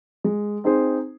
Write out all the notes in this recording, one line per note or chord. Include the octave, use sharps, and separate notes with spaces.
G#3
C4 D#4 G#4 C5